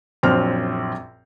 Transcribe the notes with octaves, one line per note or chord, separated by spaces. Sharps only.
A#1 F#2 C4 C5 F6